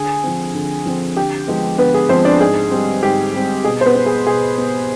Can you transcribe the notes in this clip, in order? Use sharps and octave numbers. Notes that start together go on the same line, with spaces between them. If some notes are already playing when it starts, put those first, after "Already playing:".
Already playing: D3 G#4 G#5
F3 C4
D3
F3 C4
D3 G4 G5
F3 G#3 B3
D3 B3 B4
G#4
F3 G#3 B3 C4 C5
D4 D5
G#2 G#4
G3 C4
G#2 G4
G3 C4
B2 G#4
C5
B3 B4
B3
G#4
B2 G#4
B3